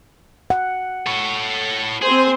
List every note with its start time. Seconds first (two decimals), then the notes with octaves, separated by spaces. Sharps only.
0.50 F#5
1.07 A4 C#5
2.02 C4 G#4 C5